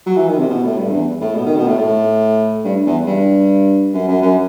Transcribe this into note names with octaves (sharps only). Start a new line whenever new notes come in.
F#3
E3
D#3
C3
B2
A2
G2
E2
A2
B2
D#3
B2
A2
A2
G2
E2
G2
F#2
F#2
F#2